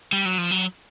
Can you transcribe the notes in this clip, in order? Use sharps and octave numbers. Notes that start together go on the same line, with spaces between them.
G3
F#3
F3
F#3